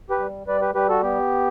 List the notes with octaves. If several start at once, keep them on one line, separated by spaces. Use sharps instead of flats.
G4 B4
G3
G3 B4 D5
G4 B4
G3 G4 B4
F#4 A4
B3 G4